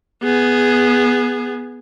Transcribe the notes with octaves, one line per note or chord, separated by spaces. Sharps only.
B3 G#4